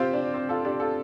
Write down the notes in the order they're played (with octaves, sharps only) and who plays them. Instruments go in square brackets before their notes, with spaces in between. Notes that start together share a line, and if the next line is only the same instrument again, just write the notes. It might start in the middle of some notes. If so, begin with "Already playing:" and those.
Already playing: [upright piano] C4 F4 G4 C5
D4
C4
F4 A4
D4 G4
F4 A4